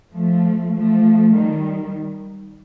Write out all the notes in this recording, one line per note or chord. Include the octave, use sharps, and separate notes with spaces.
F3 A3
F3 A3
D#3 G3